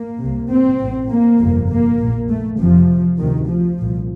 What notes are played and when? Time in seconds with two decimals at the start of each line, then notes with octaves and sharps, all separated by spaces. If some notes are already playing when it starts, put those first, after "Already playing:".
Already playing: A#3
0.19 C2 C3
0.50 C4
0.80 A1 A2
1.09 A#3
1.39 G1 F2 C3
1.69 A#3
1.99 A#1 A#2
2.29 A3
2.58 F1 F2 C3 F3
3.19 D2 C3 D#3
3.48 F3
3.78 C2 A#2